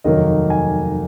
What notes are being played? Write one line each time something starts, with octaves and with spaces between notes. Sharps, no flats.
F1 D#2 D#3 F#3 A#3 D#5
G#5